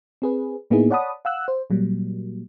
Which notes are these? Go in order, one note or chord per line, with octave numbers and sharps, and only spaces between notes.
C4 G#4 B4
A2 A#3 B3 D#4 E4 G#4
C#5 D5 F#5 A5 B5 D#6
F5 F#5 E6 F#6
C5
A#2 F#3 G3 A#3